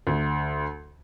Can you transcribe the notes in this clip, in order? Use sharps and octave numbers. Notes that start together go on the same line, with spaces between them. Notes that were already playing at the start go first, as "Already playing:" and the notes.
D2